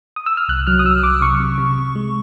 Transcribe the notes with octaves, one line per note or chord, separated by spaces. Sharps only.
D#6
E6
F6
C2 F#6
F#3 F6
D#6
F#3 E6
C2 D6
C3 C#6
C3
C3
C3
G#3